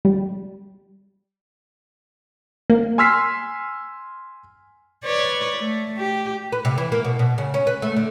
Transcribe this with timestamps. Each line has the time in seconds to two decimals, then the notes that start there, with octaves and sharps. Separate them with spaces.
0.05 G3
2.70 A#3
2.98 G#5 C6 E6 F6 B6 C7
5.04 B4 C#5 D5
5.58 A3
5.98 G4
6.52 B4
6.65 C3
6.78 E3
6.92 A#3
7.04 B2
7.19 B2
7.38 C#3
7.54 C#4
7.67 B4
7.82 A3
7.96 D3